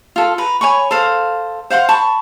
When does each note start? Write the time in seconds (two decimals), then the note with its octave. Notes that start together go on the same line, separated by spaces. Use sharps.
0.16 F4 A4
0.38 B4 A#5
0.61 C#5 G#5 B5 C#6
0.91 A4 C5 F5
1.70 C5 F5 F#5 C6
1.89 A5 B5 C#6